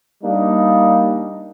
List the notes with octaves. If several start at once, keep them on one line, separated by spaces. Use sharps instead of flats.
G3 A#3 D4 D#4